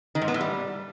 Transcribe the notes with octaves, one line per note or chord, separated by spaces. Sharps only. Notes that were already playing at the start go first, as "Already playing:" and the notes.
D#3
G#2
B3
A2
G3